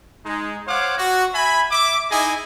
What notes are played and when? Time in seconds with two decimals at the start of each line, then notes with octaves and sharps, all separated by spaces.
0.25 G#3 D#4
0.67 C5 C#5 F5 F#5 D6
0.97 F#4
1.33 E5 G#5 B5
1.71 E5 D6
2.10 D#4 E4 G#4 D#5 G#5